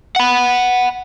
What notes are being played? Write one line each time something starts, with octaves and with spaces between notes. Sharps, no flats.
F#5 B5